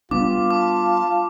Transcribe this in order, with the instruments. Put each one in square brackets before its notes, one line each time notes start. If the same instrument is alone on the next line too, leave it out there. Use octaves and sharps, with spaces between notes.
[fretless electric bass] G3 B3 D4 [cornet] F4 [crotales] D6
[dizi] A5 [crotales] D6